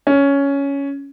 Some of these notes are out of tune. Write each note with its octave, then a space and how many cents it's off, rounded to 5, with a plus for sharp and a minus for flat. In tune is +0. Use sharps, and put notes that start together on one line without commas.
C#4 +10